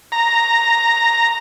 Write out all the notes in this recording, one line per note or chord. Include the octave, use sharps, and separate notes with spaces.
A#5